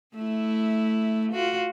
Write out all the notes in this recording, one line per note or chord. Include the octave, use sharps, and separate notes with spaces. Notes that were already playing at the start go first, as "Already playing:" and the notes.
A3 E4
F4 F#4